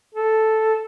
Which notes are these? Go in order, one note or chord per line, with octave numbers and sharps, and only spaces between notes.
A4